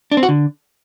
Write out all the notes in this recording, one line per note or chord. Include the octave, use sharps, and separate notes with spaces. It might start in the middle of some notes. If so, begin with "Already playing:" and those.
D4
C4
F#4
D3